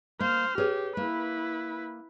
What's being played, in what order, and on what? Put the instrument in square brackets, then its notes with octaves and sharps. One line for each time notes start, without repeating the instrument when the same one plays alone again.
[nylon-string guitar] A#3 [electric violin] C5 F6
[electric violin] G4 [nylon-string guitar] G#4 B4 C#5
[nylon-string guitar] A#3 [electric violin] E4 B4